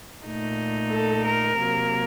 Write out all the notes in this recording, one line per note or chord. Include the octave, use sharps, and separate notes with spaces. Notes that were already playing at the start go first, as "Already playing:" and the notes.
A#2 A3 D#4
A4
A#4
C3 F#3 A#3